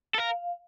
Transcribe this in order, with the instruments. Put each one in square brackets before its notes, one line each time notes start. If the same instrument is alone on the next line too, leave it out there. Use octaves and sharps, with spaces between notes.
[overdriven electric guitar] A4
[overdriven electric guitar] A#4 [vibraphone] F5